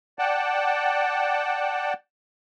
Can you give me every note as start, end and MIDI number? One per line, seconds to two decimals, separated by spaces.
0.19 1.93 74
0.19 1.93 78
0.19 1.93 79
0.19 1.93 81